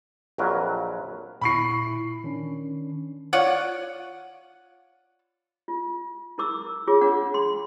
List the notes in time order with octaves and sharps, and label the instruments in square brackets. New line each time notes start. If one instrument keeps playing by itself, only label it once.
[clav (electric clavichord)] A#1 F2 F#3 A#4 B4
[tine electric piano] A#2 E4 [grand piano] B5 C#6 C7
[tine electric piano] D#3 C#4 D4
[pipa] F4 C#5 D5 F#5
[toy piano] F4
E4 A#4 D6 E6
F4 G#4 C#5 D6
D4 C#5 F#5
C6